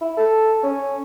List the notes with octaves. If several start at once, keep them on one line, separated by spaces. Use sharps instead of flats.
E4
A4
C#4